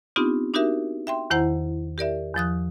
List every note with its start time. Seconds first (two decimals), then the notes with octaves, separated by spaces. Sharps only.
0.16 B3 C4 D4 D#4 F4 G4
0.54 D4 D#4 F#4 G4 A#4 E5
1.07 E5 G5 C6
1.30 E2 D#3 E4 C5 F#5 A#5
1.98 G4 A#4 D5 E5
2.35 E2 F3 D#6 F#6